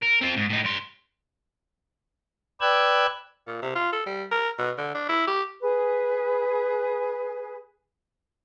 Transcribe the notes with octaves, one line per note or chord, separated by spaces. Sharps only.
A#4
C4 F4
G#2
A2 D#4
G2 C6
B4 D5 G5 E6 F#6 G#6
A#2
C3
F4
A4
G3
A#4
B2
D3
D4
E4
G4
G#4 B4